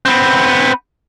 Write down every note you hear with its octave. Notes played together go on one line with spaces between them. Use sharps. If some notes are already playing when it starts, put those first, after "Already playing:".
B3 C4